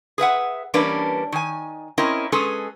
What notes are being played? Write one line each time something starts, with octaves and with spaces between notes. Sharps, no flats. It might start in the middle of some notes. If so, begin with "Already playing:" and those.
G#4 B4 E5 F#5
E3 G3 A#3 C#4 D4 B4
D#3 G#5
C4 C#4 E4 A#4 D#5
G#3 C#4 G#4 A4 B4